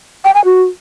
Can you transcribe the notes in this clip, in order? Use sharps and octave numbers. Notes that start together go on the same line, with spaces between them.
G5
G#5
F#4